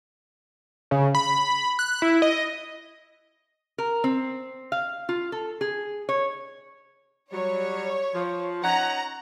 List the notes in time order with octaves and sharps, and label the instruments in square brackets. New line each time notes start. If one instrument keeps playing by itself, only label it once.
[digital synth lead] C#3
B5
F#6
E4
D#5
[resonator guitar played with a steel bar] A#4
C4
F5
F4
A4
G#4
C#5
[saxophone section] F#3 G3 [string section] C#5
[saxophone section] F3
[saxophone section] C#4 D#4 F#5 [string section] A#5